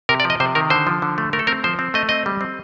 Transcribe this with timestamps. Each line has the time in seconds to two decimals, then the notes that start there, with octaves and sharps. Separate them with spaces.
0.09 C3 A#4
0.20 D5
0.25 F3
0.30 D#5
0.40 C3 C5
0.55 D#3 A#4
0.70 D3 C5
0.87 F3
1.02 D3
1.18 A3
1.33 A3 A#4
1.39 A4
1.47 C4 A#4
1.64 F3 C5
1.79 C4
1.94 A3 D#5
2.09 C4 D#5
2.26 G3
2.41 C4